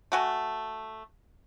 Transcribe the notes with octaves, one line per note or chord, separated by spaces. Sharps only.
A3 F#4 G#5